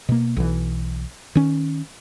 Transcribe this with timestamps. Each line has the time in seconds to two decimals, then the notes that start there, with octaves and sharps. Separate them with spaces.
0.09 B2 A#3
0.37 B1 E3
1.35 D#3 C#4